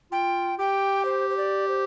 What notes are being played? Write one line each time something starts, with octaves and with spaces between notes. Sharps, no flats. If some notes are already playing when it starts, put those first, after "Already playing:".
F4 G5
G4 G5
C5
C5
D5
C5